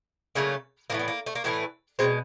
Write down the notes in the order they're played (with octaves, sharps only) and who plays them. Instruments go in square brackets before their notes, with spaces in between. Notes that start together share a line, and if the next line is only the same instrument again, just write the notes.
[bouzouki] C#3 F#3 A3 A#3
A2 E3 A3 A#3
B3
A#3
A3
A#3
A2 E3 A3 B3
B2 G#3 C4